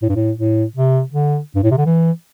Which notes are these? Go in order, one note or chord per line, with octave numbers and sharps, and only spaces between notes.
A2
G2
A2
A2
C3
D3
G2
A2
C3
D3
E3